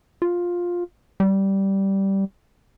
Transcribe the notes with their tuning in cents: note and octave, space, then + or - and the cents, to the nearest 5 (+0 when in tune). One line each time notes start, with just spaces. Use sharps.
F4 +10
G3 -10